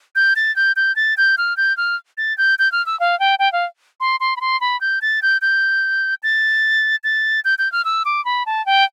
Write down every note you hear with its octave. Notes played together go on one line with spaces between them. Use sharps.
G6
A6
G6
G6
A6
G6
F6
G6
F6
A6
G6
G6
F6
E6
F5
G5
G5
F5
C6
C6
B5
C6
B5
G6
A6
G6
G6
A6
A6
G6
G6
F6
E6
D6
B5
A5
G5